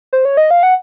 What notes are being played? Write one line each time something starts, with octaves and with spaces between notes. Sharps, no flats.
C5
C#5
D#5
F5
F#5